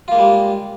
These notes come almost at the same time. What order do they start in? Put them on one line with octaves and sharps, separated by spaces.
F4 A#3 G#3 G3